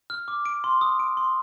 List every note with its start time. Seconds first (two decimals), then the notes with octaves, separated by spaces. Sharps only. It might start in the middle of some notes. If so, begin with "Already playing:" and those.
0.10 F6
0.28 D6
0.46 D7
0.64 C6
0.81 D#6
1.00 D7
1.17 C6